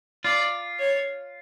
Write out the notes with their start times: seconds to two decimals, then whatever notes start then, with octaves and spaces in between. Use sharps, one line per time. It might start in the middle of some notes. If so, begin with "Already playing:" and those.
0.25 F4 D5
0.80 C#5